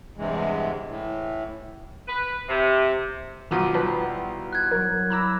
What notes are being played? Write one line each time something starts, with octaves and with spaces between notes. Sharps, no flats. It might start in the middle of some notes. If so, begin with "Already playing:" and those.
E2 G2 C3 E3 G#3
A2 E3
B4
C3
B1 D#3 F3 D6 D#6 D#7
G3 B3 B4 A5 B5
E4
F#6 G#6
F#3 A#4
E4 A#5 B5 D6 E6 A#6